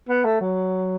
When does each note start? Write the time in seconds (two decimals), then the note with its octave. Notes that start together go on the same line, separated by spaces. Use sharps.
0.09 B3
0.25 A3
0.41 F#3